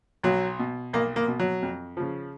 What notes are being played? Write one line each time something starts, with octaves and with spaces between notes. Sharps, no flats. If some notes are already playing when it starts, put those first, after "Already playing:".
B1 F#3
B2
B1 A#3
A#3
B2
F#3
F2
C#3 F3